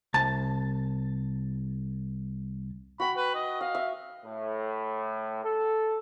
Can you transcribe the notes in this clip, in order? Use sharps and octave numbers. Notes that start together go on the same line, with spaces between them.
C2 A5
F#4 G5 B5
B4
D#5
D#5 F5
E5
A2
A4